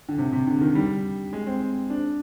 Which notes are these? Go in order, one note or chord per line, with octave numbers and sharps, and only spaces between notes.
D3
C3
C3
D3
D#3
G3
G#3
C4
D4